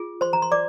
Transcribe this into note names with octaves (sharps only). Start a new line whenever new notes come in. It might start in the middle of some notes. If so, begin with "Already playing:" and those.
Already playing: F4 G#4
C5 C6
A#5
C6
D5 D6